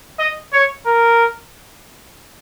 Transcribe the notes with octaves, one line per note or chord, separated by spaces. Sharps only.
D#5
C#5
A#4